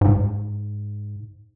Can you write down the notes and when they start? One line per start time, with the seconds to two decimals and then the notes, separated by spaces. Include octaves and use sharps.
0.01 G#2